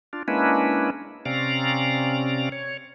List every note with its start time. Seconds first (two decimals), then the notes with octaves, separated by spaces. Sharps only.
0.13 D4 F4
0.28 G#3 A#3 C#4 D4 E4 B4
1.25 C3 C4 C#4 D5 F5 A#5
2.52 C#5